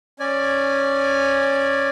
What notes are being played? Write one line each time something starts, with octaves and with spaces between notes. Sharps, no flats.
C#4 D5 G#5